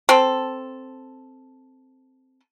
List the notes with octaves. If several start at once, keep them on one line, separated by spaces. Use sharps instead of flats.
C4 A4